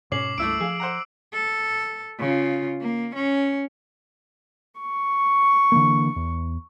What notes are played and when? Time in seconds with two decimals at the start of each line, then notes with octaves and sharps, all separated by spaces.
0.12 G#2 B2 C#4 D6 C7 F#7
0.38 C#2 G2 A3 E4 D6 E6 D7
0.60 F3 G#4 F5
0.80 C5 F#5 A#5
1.33 A4
2.19 C#3 F4
2.82 A#3
3.15 C#4
4.79 C#6
5.72 D3 E3 A#3
6.16 E2